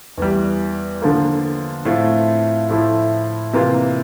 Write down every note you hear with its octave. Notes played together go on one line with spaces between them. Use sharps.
E2 E3 G3
D3 F3 A#3
A2 F3 A3 C4 F4
A2 F3 A3 E4
C3 E3 A#3 F4